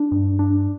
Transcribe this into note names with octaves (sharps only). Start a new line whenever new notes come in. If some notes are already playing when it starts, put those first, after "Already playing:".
Already playing: D4
G2
D4